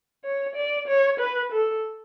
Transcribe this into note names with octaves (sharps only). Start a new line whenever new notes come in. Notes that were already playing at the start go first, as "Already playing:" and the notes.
C#5
D5
C#5
B4
A4